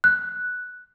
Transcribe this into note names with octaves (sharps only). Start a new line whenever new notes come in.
F#6